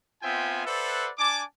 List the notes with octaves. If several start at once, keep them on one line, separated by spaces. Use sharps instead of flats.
B3 C4 F4 E5 G5 G#5
A4 B4 C5 D5 E5 F#5
D4 G#5 A5 D6